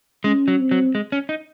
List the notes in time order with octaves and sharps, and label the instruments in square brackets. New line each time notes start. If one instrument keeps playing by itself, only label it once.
[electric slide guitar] G#3 [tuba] C#4
[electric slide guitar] F#3
[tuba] C4
[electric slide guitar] F#3
G#3
C#4
D#4